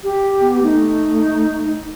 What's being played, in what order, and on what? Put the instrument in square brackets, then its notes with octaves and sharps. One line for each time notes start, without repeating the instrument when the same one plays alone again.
[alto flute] G4
[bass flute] B3
[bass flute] A3 [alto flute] D#4